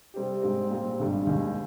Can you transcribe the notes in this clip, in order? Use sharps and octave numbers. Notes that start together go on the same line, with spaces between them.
C3 G3 C4 G4
G#2 G3 C4
A#2 G3 C4
G#1 G2 G3
D#2 D#3 G#3